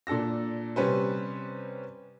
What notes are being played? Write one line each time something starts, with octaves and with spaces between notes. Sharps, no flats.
A#2 D4 A4 E6 A#6
C3 G3 C#4 B4 C5